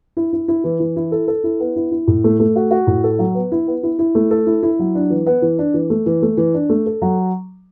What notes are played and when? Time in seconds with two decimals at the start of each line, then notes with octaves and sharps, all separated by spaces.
0.17 E4
0.33 E4
0.48 E4
0.64 E3
0.80 E3
0.96 E4
1.12 A4
1.28 A4
1.44 E4
1.60 B3
1.76 E4
1.92 E4
2.08 A2
2.24 A3
2.40 A3
2.56 F#4
2.71 F#4
2.87 A2
3.04 A4
3.19 F#3
3.35 B3
3.52 E4
3.67 B3
3.83 E4
3.99 E4
4.15 A3
4.31 A4
4.47 E4
4.63 E4
4.79 F#3
4.95 D4
5.10 E3
5.27 B3
5.42 E3
5.59 D4
5.74 E3
5.90 A3
6.06 E3
6.22 A3
6.37 E3
6.54 D4
6.69 A3
6.86 A4
7.02 F#3